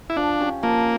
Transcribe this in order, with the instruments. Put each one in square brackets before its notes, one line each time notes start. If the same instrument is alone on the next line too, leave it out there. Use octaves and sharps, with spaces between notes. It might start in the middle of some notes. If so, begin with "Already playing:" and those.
[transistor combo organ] E4
[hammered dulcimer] F3 [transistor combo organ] D4
[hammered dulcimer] C#4 G4
[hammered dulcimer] F3 [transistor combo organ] A#3